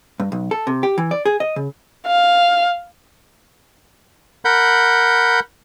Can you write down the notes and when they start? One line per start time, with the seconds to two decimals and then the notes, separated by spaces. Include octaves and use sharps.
0.20 G2
0.32 B1
0.51 A4
0.67 C3
0.83 G4
0.98 E3
1.11 D5
1.26 G#4
1.40 D#5
1.56 C#3
2.06 F5
4.45 A#4 F#5 B5 G6